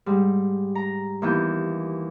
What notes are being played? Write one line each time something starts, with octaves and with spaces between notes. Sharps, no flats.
G#2 G3
A#5
D#2 E3 B3 G6